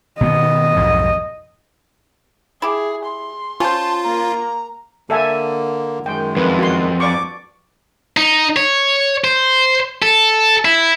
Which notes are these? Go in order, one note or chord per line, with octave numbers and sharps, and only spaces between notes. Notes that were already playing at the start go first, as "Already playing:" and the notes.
B2 D#3 B3 D#5
B1 F2 G#2
E4 G4 G#4
C6
C#4 F4 C5 A5
A#3 A#5
D3 A#3 A4 E5 G#5
F#2 D#3 G#3 G5
F2 B4
F#4 C6
D5 C#6 D6
D#4
C#5
C5
A4
E4